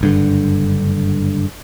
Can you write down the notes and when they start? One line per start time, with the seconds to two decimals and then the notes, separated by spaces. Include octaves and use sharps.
0.01 F#1 G2 D3